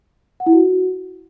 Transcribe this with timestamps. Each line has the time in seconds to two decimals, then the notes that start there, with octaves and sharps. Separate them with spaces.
0.40 F#5
0.46 E4
0.53 F#4